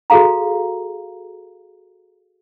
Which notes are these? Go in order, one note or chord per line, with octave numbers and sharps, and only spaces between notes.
F#4 G#4 A4 F5 A#5